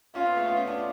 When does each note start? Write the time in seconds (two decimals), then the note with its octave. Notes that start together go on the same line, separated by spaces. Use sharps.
0.15 C#4 F4
0.26 B3
0.37 A3
0.47 B3
0.57 C#4
0.67 D4